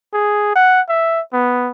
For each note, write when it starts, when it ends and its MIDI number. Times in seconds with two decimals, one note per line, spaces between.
0.13 0.55 68
0.55 0.81 78
0.89 1.20 76
1.33 1.71 59